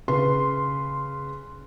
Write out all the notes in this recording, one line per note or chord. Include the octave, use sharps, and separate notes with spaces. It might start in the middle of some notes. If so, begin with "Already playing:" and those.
C#3 B4 C6